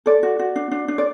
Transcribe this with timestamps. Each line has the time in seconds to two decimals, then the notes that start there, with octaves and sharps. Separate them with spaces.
0.06 A4 D5
0.23 F#4
0.39 F#4
0.56 D4
0.71 D4
0.88 D4
0.98 D5